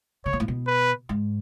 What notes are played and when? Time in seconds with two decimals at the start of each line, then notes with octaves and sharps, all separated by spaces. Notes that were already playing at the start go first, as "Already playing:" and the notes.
0.25 C#3 C#5
0.33 B2
0.40 A2
0.48 B2
0.67 B4
1.09 G#2